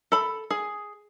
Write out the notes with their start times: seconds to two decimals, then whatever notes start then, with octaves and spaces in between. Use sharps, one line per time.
0.12 A4 B5
0.51 G#4